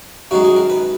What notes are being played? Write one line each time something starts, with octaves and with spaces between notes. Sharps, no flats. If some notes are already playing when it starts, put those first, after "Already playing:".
F#2 D#3 G#3 D#4 F#4
G#4
A#4
B4